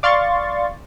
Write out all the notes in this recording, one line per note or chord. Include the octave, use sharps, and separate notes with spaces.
D5 F5 C6 C#6 A6